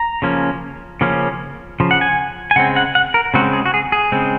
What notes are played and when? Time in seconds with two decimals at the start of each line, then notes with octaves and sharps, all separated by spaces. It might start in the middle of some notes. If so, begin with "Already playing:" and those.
Already playing: A#5
0.22 C#3 F3 A#3 C#4
1.01 C#3 F3 A#3 C#4
1.80 C#3 F3
1.91 F#5
2.01 G#5
2.51 G#5
2.56 C#3 G#3 C4 F#5
2.76 F#5
2.95 F#5
3.14 A#4
3.34 C#3 G#3 C4 F#4
3.53 G#4
3.66 F#4
3.74 G#4
3.92 G#4
4.12 C#3 G#3 C4